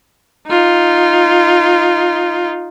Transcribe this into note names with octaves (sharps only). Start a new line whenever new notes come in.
D#4 F4